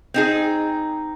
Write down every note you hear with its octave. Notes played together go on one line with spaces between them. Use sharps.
C4 D#4 G#4